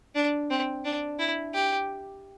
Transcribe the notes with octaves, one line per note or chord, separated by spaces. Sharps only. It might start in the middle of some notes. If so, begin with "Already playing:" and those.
D4
C4
D4
E4
G4